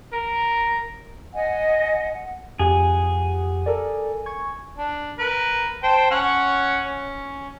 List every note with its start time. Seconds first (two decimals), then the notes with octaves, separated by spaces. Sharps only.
0.13 A#4
1.34 D#5 F#5 G#5
2.59 F2 G4 G#4 F#5
3.66 A4 A#4 D5
4.26 C#6 G#6
4.77 D4
5.19 A#4 B4
5.83 C5 G5 A5
6.11 C#4 C#5 F#5
6.86 C#4